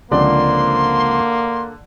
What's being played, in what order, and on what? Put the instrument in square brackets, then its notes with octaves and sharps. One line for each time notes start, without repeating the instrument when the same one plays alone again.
[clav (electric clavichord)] C#2 F3 C4 [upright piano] D3 D5 [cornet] A#3 [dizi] C6